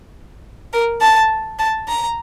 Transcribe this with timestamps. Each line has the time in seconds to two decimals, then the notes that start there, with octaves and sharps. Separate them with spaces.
0.73 A#4
1.01 A5
1.59 A5
1.88 A#5